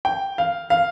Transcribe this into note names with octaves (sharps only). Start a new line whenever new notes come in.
G5
F5
F5